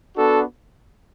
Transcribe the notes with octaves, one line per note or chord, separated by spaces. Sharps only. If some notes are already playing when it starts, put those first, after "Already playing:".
B3 D4 F#4 A4